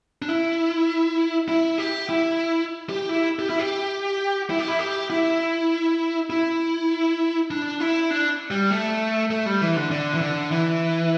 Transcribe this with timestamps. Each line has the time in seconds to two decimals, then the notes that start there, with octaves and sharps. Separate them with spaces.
0.22 D4
0.28 E4
1.48 E4
1.78 G4
2.09 E4
2.89 G4
3.09 E4
3.39 G4
3.50 E4
3.59 G4
4.50 E4
4.59 G4
4.68 E4
4.79 G4
5.10 E4
6.30 E4
7.51 D4
7.80 E4
8.11 D4
8.51 G3
8.71 A3
9.30 A3
9.46 G3
9.61 E3
9.76 D3
9.91 D3
10.14 E3
10.21 D3
10.51 E3